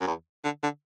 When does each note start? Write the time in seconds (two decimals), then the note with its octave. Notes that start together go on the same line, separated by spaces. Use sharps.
0.01 F#2
0.07 E2
0.44 D3
0.63 D3